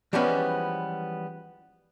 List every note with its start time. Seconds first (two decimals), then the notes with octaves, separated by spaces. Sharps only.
0.13 E3 F3 G3 G#3 B3 C#4